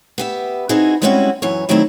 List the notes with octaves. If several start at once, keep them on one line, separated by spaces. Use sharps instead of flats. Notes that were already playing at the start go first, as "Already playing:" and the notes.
B3 G4 E5
C4 D#4 E4 F#4 G#4
G3 G#3 C4 C#4 E4 F#4
F#2 E3 C#5
D#3 F#3 G3 A3 C4 E4